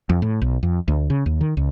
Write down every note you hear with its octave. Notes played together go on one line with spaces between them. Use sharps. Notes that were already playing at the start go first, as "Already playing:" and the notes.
F2
A2
B1
F2
D2
C#3
D#2
D#3
C#2